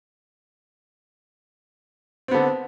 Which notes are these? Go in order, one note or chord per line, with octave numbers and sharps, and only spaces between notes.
D3 B3 C4